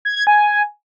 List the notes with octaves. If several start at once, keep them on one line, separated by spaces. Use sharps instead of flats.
G#6
G#6
G#5